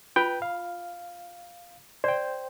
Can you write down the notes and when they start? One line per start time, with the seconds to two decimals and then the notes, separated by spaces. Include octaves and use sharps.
0.16 F4 B4 G5 B5
0.42 F5
2.04 C5 D5 G5